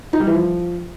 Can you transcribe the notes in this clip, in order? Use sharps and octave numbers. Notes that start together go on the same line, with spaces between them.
D#4
G3
E3
F3